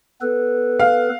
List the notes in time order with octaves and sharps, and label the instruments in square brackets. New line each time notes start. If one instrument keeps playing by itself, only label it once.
[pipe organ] B3 A4 B4
[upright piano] F5